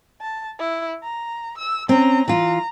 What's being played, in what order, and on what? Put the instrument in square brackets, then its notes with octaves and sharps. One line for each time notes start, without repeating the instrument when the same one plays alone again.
[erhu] A5
E4
A#5
E6
[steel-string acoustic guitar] C4 C#4 [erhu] A#5
[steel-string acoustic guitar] E3 F4 [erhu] A#5